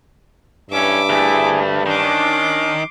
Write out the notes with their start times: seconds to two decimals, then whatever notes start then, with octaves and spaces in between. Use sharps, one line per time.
0.70 B1 G2 E3 C#4 E5 D6
1.10 D2 A3 E4 G#4
1.86 D#3 C#4 D4 C6 D6